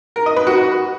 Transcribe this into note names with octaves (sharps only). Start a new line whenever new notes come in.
A#4
D#5
B4
F#4